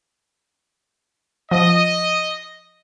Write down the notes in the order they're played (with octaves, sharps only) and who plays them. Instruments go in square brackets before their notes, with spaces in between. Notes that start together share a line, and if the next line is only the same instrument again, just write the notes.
[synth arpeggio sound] F3 [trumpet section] D#5